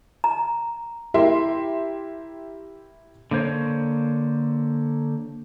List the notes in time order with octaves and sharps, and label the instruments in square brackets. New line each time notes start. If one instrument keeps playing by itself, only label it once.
[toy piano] A#5
[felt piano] E4 G4 A#4 E5 C6
[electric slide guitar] D3 A#3 C5 C#5